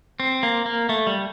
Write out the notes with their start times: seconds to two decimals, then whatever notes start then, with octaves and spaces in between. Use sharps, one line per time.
0.20 C4
0.43 A#3
0.66 A#3
0.89 A3
1.07 G3